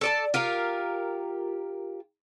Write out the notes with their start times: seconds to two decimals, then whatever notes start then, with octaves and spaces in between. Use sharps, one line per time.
0.01 A4 D5 A5
0.34 F4 G4 A#4 F5